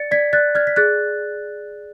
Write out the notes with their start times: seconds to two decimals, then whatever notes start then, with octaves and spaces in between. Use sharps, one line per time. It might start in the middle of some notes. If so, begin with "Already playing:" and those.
Already playing: D5 A6 C#7
0.11 D5 G#6 B6
0.33 D5 F#6 A6
0.55 D5 F6 G#6
0.67 B6
0.76 G#4 F#6 A6